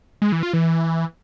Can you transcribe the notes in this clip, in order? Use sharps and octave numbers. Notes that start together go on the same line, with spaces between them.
G#3
E3
F4
E3